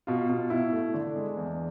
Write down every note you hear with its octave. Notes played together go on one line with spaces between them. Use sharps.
B2 F4
B2
B2 E4
A3
D3 D4
G#3
E2